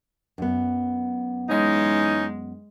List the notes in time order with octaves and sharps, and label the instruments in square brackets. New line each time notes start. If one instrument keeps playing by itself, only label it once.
[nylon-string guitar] F#2 B3
[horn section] E3 C#4 D#4 [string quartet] G#3